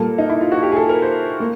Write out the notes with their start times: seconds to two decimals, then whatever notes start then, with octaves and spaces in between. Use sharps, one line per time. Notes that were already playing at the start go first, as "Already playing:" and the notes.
Already playing: A#2 G3 A#3 A4
0.18 D#4
0.30 E4
0.41 F4
0.52 F#4
0.63 G4
0.72 G#4
0.76 A4
0.89 A#4
1.02 C5
1.40 A#3